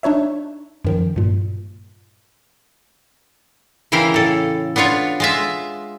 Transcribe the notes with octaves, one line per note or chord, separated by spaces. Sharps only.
D4 D#4 C#5 E5
F#2 D#3 F3
G2 A#2
C#3 E3 E4 A#4 F5 G5
A2 A4
B3 D4 F4 C#5 F5
G#3 F4 E5